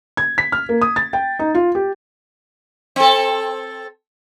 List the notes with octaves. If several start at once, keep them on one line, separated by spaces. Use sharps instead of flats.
G#6
B6
F6
A#3
D#6
A6
G5
D#4
F4
G4
C4 A4